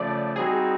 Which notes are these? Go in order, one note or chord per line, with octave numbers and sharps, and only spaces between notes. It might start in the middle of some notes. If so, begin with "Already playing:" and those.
Already playing: C#3 F3 A3 D5
G3 C4 D#4 F#4 G#4